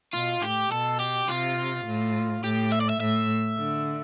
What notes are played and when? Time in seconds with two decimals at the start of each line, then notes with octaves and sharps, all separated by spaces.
0.14 B2 F4
0.43 A2 G4
0.72 B2 A4
1.00 G4
1.28 C3 F4
1.86 A2
2.43 A2 G4
2.72 E5
2.81 D5
2.89 E5
3.00 A2 E5
3.58 D3